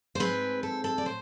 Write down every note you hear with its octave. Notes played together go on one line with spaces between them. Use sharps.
C5
G#2 G#3 C4 B4
A4
A4
D5
A2 C5